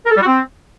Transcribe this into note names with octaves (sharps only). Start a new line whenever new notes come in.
A#4
A4
G3
F#4
C4